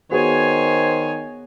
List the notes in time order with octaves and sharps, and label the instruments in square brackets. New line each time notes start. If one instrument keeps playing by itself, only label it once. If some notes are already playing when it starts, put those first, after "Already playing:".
[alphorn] D#3 [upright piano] B3 F#4 G#4 [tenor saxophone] C5 [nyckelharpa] C#5 G#5